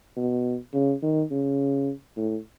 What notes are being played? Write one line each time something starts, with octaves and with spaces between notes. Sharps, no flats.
B2
C#3
D#3
C#3
A2